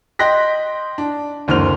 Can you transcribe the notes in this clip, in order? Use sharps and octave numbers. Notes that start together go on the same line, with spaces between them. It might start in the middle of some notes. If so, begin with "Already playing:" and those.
D#5 G5 C6 F#6 A#6 B6
D4
F#1 D2 C4 C5 F6 F7